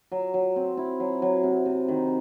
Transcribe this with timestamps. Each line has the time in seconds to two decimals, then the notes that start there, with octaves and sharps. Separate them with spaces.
0.12 F#3
0.34 F#3
0.56 C4
0.77 E4
1.00 F#3
1.22 F#3
1.43 C3
1.66 C3
1.88 D#3